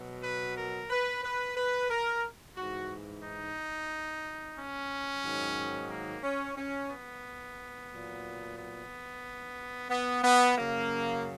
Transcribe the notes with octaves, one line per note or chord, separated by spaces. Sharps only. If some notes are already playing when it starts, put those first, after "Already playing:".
Already playing: B2 F#3
B4
A#4
B4
B4
B4
A#4
G#2 E3 F#4
D#4
C#4
G#2 D#3 F#3
A#3
C#4
C#4
B3
A#2 F#3
B3
B3
B3
F#2 C#3 F#3 A#3